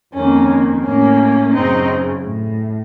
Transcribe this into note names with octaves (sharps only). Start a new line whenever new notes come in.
F2 D#3 A#3 C#4
A#3
A2 A#3 C#4
F#2 C#3 C4 D#4
A2